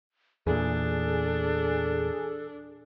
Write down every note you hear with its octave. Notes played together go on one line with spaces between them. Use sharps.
E2 A#2 D4 G#4 A4